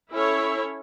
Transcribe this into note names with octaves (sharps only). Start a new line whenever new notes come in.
C#4 E4 A4 C#5 E5